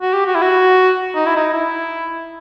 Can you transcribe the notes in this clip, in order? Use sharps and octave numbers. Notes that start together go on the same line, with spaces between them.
F#4
G4
F#4
E4
F#4
D#4
E4
D#4
E4